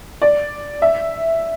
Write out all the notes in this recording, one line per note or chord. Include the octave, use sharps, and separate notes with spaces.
D5
E5